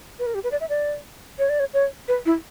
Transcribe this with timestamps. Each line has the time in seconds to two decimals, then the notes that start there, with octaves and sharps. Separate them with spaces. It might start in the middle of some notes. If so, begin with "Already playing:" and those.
0.19 B4
0.26 A#4
0.34 G4
0.44 B4
0.52 D5
0.60 E5
0.69 D5
1.39 C#5
1.49 D5
1.60 C#5
1.74 C#5
2.08 B4
2.26 E4